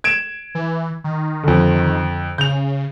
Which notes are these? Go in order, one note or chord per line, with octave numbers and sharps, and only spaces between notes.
G#6 D7 E7
E3
D#3
F2 D3
C#3 G6 F7